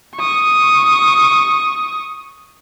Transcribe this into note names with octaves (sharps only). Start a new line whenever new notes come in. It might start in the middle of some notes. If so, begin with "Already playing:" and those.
C#6 D#6